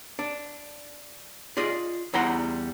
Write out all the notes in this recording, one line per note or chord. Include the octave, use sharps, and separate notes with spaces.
D4
F4 G#4 D5 D#5
E2 G3 E4 F#5 A#5 C6